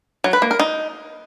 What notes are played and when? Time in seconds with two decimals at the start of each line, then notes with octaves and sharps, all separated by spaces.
0.24 F#3
0.33 B4
0.42 A#3
0.51 A#4
0.59 D#4